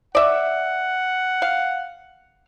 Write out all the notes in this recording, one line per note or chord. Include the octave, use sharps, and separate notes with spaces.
D5 E5 F#5
F5